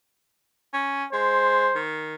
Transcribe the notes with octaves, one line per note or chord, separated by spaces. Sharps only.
C#4
G#3 C5
D#3